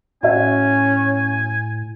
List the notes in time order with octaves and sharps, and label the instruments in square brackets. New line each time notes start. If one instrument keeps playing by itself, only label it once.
[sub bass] A2 [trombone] C#4 [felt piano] F#4 E5 [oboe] G#5